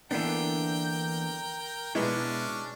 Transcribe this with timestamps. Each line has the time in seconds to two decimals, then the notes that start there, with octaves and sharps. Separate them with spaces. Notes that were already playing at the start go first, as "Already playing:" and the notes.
0.11 D3 E3 A#3 B3 D4 A#4 G5
1.95 B2 G#3 B3 C#4 D4 E4